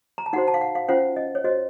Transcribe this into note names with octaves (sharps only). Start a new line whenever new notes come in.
A#5
A5
D#4 F#4 C5 F#5
A5
F5
F#5
F5
C#4 F4 C5 F#5
D#5
C#5
F#4 C5 D#5